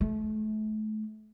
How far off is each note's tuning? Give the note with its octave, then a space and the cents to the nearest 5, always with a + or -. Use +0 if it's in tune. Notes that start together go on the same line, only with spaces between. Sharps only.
A3 -35